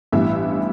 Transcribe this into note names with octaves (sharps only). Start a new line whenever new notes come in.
A1 G2 E3 B3 E5